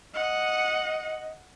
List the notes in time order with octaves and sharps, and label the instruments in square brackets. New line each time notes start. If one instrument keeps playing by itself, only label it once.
[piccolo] D#5 [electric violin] F#5